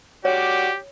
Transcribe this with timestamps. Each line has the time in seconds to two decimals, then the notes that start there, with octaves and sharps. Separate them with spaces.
0.25 F#4 G4 C#5 D5